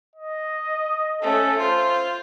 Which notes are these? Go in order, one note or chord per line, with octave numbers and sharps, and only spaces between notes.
D#5
A3 C#4 A4
F4 C5